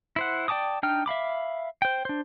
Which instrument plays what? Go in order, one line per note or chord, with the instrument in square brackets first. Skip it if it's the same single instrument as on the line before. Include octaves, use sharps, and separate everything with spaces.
[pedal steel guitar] E4 C5 F#5
D5 G5 A5 D6 D#6
D4 D#4 G5 F6
E5 F5 B5 D6
C5 G5
D4 C5